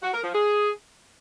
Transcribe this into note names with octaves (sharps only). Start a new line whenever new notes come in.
F#4
A#4
F3
G#4